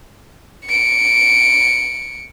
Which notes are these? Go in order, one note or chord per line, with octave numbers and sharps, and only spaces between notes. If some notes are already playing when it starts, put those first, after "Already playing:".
C#7 D7